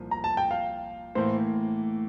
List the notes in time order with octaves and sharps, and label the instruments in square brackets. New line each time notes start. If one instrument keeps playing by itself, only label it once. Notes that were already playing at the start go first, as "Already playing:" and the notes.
Already playing: [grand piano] C2 A#2 F3
[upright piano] A#5
A5
G5
F5
[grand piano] A2 E3 A#3 [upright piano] C5